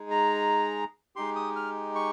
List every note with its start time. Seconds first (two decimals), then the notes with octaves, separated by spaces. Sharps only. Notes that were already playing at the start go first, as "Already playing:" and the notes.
Already playing: G#3 D#4 G#4
0.11 A#5
1.16 G#3 D#4 G4 C6
1.36 D#6
1.56 F6
1.95 C#6